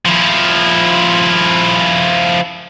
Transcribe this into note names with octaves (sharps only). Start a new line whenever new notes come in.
F3 E4